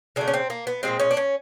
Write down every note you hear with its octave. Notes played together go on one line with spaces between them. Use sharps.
C#3 F#3 A3 D4
C#4
C4
A#3
B3
A#2 F3 G#3 C4
C#4
D4
C#4